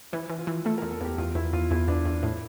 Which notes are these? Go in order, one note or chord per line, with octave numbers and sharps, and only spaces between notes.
E3 E4
E3
F4
E3
A3 A4
E2 A#4
A4
E2 G4
E2 F4
E2 E4
E2 F4
E2 E4
E2 D4
E2
A2 E4